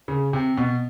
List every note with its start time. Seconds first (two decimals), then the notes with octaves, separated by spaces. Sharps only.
0.08 C#3
0.33 C3
0.57 B2